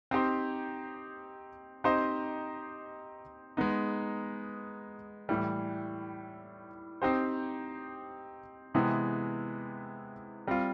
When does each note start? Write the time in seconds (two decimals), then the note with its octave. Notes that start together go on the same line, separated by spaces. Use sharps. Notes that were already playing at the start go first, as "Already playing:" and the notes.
0.11 C4 D#4 G4 C5
1.84 C4 D#4 G4 C5 D#5
3.57 G#3 B3 D#4
5.29 A2 E3 G3
7.02 C4 D#4 G4 C5
8.74 C3 E3 G#3 B3
10.47 G3 C4 F4